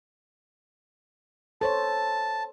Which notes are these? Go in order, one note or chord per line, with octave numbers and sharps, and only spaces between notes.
A4 C5 C#5 A5